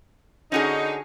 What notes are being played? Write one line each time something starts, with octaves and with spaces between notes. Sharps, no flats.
D3 C#4 D#4 F#4 G#4